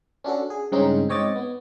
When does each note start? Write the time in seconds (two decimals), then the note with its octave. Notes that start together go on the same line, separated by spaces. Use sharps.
0.24 C#4 D4 F#4 A4
0.50 G#4
0.72 G2 C#3 G#3 C4 C#4 D#4
1.09 G#2 C4 C#5 D#5 D6 A6
1.36 B3